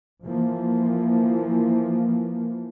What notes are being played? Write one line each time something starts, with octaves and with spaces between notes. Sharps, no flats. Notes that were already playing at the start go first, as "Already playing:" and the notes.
E3 F3 A#3